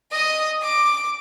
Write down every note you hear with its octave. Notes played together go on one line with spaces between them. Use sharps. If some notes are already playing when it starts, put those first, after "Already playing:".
D#5 D#6
D6